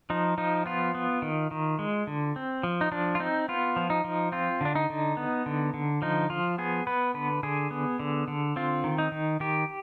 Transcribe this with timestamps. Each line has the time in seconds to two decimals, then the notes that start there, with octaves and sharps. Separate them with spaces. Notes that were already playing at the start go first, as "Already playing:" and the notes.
0.10 F3 D#4
0.38 F3 D#4
0.66 B3 F4
0.95 B3
1.22 D#3
1.51 D#3
1.79 G#3
2.07 D3
2.36 C4
2.63 F3
2.81 D#4
2.92 F3 D4
3.15 F4
3.20 C4 D#4
3.49 B3 F4
3.76 F3
3.90 D#4
4.04 F3
4.32 C4 F4
4.61 D3 D4
4.75 D#4
4.90 D3
5.17 B3
5.46 D3
5.74 D3
6.02 F3 D#4
6.30 F3 F4
6.58 B3 G#4
6.87 B3 B4
7.14 D3 B4
7.43 D3 G#4
7.71 B3
7.99 D3
8.28 D3
8.56 C4 F4
8.84 D#3
8.98 D#4
9.12 D#3
9.40 D#3 G4